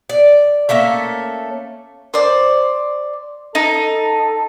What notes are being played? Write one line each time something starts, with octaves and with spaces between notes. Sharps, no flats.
D5
A3 A#3 C#4 E5
C5 D5
D#4 A4